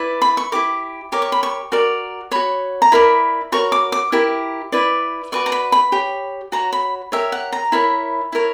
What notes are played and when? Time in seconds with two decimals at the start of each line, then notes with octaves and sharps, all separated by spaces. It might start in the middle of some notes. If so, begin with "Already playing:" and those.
Already playing: E4 B4 D5
0.22 B5
0.37 C#6
0.52 E4 G4 A#4 D6
1.12 G4 A#4 C#5 D6
1.22 C#6
1.32 B5
1.43 C#6
1.72 F#4 A#4 D5
2.31 F#4 C#5 B5
2.82 A#5
2.92 E4 A#4 D5 B5
3.52 F#4 A#4 C#5 C#6
3.72 D6
3.92 D6
4.12 E4 G4 A#4
4.72 E4 B4 D5
5.32 F#4 B4 D5 C#6
5.46 A#5
5.52 B5
5.72 B5
5.92 G4 C#5
6.52 F#4 C#5 A#5
6.73 B5
7.12 G4 A#4 C#5 E5
7.32 F#5
7.53 A#5
7.72 E4 A#4 C#5 B5
8.33 E4 A#4 C#5